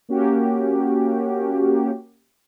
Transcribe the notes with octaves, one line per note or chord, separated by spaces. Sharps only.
A#3 C#4 F#4 G4